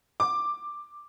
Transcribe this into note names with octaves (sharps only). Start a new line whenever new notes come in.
D6